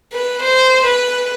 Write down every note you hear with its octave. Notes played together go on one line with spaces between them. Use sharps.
B4
C5
B4